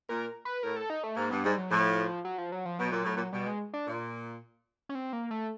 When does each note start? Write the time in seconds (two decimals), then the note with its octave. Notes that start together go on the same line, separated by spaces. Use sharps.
0.09 A#2 A#4
0.45 B4
0.63 A2 A#4
0.76 A4
0.90 D#4
1.04 A3
1.16 G#2 A#3
1.30 G2 B3
1.44 G#2 G3
1.58 F#3
1.71 A2 F3
2.25 F#3
2.38 F3
2.52 F#3
2.65 F3
2.79 B2 F#3
2.91 A#2
3.04 A2
3.16 A#2
3.33 B2 G3
3.46 G#3
3.74 D4
3.87 A#2
4.89 C#4
4.95 C4
5.13 A#3
5.31 A3